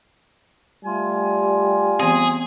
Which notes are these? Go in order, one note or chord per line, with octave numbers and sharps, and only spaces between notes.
G3 A3 F4 G#5
E3 B3 C4 G#4